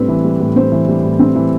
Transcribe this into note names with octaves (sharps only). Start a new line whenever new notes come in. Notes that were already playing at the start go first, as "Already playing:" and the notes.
Already playing: A2 G3 C4 B4
E3
G3
A2
C4 C5
E3
G3
A2
C4
E3